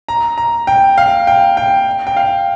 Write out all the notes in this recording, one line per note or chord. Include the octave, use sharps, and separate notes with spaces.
A#5
A#5
G5
F5
G5
G5
G5
F5